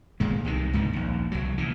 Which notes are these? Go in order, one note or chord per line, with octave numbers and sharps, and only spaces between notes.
G#1 A#2 G#3
C2 C3 D#3
C#2 G#2 B2 D3
A#1 D#2
C2 F#3
A#2 E3